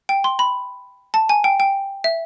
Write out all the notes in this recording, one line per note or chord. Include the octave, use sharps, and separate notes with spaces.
G5
C6
B5
A5
G#5
G5
G5
E5